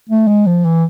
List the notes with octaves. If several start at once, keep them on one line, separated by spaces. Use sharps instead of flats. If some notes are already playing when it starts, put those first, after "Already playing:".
A3
G#3
F3
E3